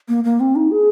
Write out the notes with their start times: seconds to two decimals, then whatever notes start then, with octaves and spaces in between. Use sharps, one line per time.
0.09 A#3
0.24 A#3
0.40 C4
0.56 D#4
0.71 G#4